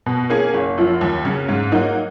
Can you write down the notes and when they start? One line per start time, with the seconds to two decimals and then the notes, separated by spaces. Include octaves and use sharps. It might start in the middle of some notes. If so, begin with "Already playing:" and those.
0.06 B2
0.30 A#3 C#4 G#4
0.54 F#1
0.77 F#2 F3
1.01 D#2
1.25 C#3 F#3 C#4
1.49 G#2
1.72 F#3 A#3 D#4 F#4